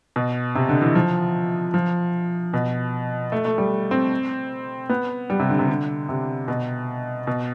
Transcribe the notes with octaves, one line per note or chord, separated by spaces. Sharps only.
B2
C3
D3
E3
F3
F3
B2
A3
A3
G3
C4
B3
G3
C3
D3
C3
D3
C3
B2
B2